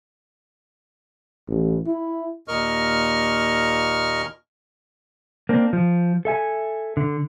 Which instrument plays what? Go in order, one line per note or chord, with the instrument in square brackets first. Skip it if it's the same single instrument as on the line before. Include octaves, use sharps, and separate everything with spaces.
[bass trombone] A1
E4
[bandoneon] D#2 A#2 A#4 D#5 C#6 F6
[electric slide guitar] A#3 C4 D4
F3
A4 E5 G#5
D3